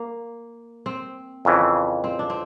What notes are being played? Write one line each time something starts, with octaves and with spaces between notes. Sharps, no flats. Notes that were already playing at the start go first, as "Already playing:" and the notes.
Already playing: A#3
C4
F2 C#3 E3
C4
D4
C4